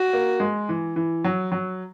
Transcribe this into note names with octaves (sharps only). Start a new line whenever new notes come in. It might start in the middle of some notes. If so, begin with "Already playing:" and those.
Already playing: F#4
A#3
G#3
E3
E3
F#3
F#3